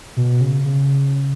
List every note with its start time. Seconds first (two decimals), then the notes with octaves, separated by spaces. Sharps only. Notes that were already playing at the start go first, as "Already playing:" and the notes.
0.16 B2
0.41 C#3
0.65 C#3